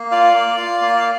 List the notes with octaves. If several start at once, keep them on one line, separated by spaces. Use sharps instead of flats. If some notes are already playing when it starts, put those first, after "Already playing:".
Already playing: A#3
F4 D5 F5
A#3
F4
A#3
D5